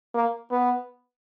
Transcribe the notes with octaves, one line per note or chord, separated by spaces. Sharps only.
A#3
B3